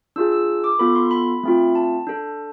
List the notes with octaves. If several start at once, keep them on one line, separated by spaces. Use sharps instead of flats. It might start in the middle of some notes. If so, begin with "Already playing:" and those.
D4 F4 G#4 E6
E6
D6
B3 F4 A4 B5
C6
B5
A3 C4 F4
A5
D4 A4